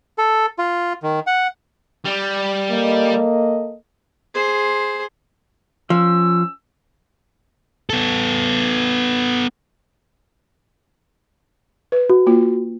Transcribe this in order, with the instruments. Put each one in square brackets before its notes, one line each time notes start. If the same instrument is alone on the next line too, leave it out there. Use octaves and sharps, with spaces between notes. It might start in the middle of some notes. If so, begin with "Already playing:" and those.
[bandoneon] A4
F4
D#3
F#5
[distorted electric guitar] G3
[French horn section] A#3 A4 D#5
[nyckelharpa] G#4 C5
[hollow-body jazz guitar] F3 [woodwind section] C#4 E6
[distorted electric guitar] B3 A4
[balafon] B4
[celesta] F#4
[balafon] A#3 F4